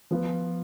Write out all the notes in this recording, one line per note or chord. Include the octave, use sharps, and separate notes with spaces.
F3 B3 F4 B4